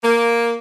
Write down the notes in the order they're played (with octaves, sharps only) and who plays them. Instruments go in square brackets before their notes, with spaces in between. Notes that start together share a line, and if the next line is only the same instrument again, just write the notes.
[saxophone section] A#3